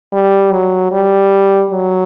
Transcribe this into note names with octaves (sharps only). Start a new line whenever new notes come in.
G3
F#3
G3
F#3